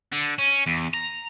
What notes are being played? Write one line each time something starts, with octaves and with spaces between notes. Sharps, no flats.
D3
C#4
E2
A#5